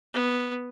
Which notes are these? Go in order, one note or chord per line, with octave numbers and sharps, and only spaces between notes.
B3